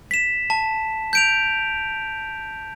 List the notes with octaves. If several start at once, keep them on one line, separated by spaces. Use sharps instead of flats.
B6 E7
A5
G6 D7 F7